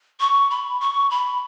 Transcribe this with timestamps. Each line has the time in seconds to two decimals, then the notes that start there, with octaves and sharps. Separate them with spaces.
0.20 C#6
0.50 B5
0.81 C#6
1.10 B5